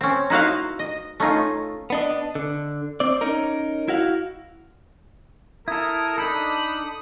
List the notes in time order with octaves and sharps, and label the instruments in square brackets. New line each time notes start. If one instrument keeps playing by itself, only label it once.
[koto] C4 C#4
D#4 E4 F#4 C5 F5
D#5
A3 C#4 D#4 F4
[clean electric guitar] B3 D4 D#5
D3
C4 D5
C#4 D#4 A#4
E4 F#4 F5
[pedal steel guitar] E4 A4 [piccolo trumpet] A#4 [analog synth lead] D#6
[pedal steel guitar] D4 D#4 A4 [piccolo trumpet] B5